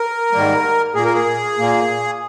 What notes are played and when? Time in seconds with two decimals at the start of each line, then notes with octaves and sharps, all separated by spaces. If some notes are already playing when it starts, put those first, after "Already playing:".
Already playing: A#4
0.32 G#2 D#3 G3 A#3
0.95 A#2 A#3 G#4
1.04 A#4
1.14 G#4
1.58 A#2 A#3